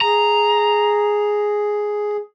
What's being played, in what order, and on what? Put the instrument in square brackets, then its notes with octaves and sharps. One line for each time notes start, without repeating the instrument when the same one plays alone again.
[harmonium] G#4 [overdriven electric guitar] A#5